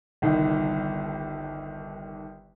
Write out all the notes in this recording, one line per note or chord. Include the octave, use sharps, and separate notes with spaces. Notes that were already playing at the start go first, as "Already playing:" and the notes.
G1 C2 D#3